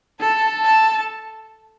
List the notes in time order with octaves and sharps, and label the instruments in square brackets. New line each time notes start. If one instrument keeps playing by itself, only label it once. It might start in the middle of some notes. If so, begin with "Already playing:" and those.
[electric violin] A4 [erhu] A5
[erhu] A5